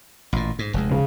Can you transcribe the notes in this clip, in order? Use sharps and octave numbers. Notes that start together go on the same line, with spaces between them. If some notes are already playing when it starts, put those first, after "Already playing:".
A1 A#2
G#2
F1 D#2 G#3
C#3